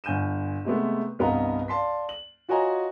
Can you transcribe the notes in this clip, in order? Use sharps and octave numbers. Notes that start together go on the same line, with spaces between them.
G1 G#5 G6 D#7 E7
C3 G#3 A3 B3
C2 G2 B3 D#5 F5 A#5
D5 F5 A5 C6 B6
F#7
F4 F#4 C#5 D#5 G#5 A#5